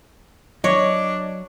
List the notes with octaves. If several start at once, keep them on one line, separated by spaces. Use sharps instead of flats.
F#3 D4 C#5 D#5